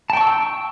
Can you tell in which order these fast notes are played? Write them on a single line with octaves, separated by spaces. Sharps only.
A5 G5 C#6 E6